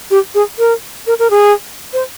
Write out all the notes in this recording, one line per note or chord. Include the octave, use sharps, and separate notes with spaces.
G4
G#4
A#4
A#4
A#4
G#4
C5